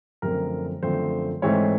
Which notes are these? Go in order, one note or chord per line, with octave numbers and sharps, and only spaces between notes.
F#2 D3 F3 A3 C4 A#4
F#2 D3 F3 A3 C4 C5
G#2 E3 A3 C4 C#5